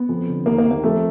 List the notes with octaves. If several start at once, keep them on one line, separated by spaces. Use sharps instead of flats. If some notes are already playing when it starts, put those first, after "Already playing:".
Already playing: B3
F2
D3
D#2 A#3
A#3
D#3
A#3
F2 A3